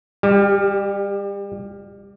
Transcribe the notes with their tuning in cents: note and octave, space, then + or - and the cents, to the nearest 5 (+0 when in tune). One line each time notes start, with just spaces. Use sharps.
G3 +30 G4 +0